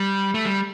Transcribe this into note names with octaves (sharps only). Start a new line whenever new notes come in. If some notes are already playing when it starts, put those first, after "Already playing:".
Already playing: G3
A3
G3